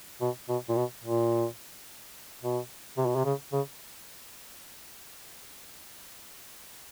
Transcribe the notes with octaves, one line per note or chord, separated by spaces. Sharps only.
B2
B2
A#2
B2
A#2
B2
C3
B2
C3
C#3
C#3